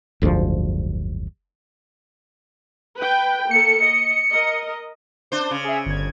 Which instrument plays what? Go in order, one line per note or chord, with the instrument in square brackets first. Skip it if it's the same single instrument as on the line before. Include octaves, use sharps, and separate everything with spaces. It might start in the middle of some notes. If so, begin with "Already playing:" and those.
[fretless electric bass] F#1 D2 G#2 F3
[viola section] B4 G5
[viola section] A#3 A4 [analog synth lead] C#7
[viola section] D#5
A#4 D#5
[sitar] D4 C5
C#3
[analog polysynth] G#4 E5
G1 G#6